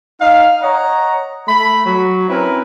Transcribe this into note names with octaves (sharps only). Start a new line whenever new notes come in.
D#4 F5
C#5 D#5 F#5 A#5
A3 B5
F#3
C4 C#4 E4 A#4 B4